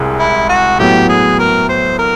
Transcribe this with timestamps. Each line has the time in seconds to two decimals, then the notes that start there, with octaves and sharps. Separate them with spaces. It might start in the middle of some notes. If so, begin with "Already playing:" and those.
Already playing: C2 C3 G#3
0.19 E4
0.49 F#4
0.79 A2 F#3 B3 G4
1.09 G#4
1.39 A#4
1.69 C5
1.99 A#4